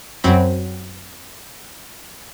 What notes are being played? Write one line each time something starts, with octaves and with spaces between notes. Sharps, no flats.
F#2 F#3 C4 B5